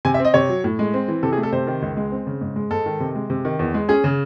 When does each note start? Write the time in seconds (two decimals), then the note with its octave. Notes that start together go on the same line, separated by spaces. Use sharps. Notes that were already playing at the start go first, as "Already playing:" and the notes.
0.05 C3 G#5
0.14 E5
0.20 C4 D#5
0.34 C3 C#5
0.49 F#3
0.64 A2
0.79 G#3
0.94 C4
1.08 E3
1.23 C3 A4
1.32 G#4
1.37 A3
1.43 A4
1.53 C3 C5
1.67 D#3
1.82 C#2
1.97 G#3
2.12 C4
2.27 C#3
2.41 G#2
2.56 G#3
2.71 G#2 A4
2.86 D#3
3.00 C3
3.15 G#3
3.30 C3
3.45 D#3
3.59 E2
3.74 G#3
3.88 C#4 G#4
4.04 C#3